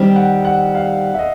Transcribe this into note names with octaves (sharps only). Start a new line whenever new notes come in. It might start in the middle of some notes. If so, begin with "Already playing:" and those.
Already playing: D#3 G3 C4
F#5
F#5
F5
E5
D#5